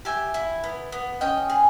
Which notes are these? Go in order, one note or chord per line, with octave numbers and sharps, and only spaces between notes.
G4 E5 G#5
E4
B3
B3
C#4 D#5 G5
G#4